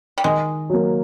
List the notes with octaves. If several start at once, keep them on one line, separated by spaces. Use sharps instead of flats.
G3
D#3 G#3
F#3 A#3